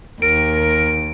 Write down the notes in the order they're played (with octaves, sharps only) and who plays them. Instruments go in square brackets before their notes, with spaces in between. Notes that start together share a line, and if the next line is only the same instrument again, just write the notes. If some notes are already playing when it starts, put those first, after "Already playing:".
[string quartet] D#2 [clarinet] A#4 [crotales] D7